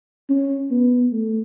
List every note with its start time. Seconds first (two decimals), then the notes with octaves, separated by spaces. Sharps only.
0.29 C#4
0.71 B3
1.12 A3